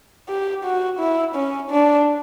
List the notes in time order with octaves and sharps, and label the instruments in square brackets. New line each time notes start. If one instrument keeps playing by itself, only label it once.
[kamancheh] G4
F#4
E4
C#4
D4